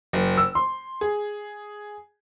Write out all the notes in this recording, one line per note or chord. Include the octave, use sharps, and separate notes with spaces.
F#1
E6
C6
G#4